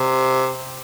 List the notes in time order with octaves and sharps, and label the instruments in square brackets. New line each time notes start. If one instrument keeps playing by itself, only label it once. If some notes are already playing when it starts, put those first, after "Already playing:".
Already playing: [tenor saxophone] C3